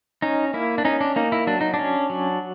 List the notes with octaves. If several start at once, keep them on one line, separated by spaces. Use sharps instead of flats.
C#4 D#4
A#3 E4
D4
C#4 D#4
D4
A#3 D#4
E4
F#3 D4
D#4
D4
C#4
F#3